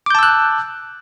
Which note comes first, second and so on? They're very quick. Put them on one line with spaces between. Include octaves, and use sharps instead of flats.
D6 G6 A5 E6 F#6